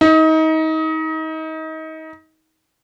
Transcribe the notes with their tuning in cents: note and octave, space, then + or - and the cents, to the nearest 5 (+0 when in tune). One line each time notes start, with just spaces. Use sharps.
D#4 +30